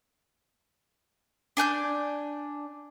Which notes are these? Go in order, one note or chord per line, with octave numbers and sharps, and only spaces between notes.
D4 G#5 F#6 G6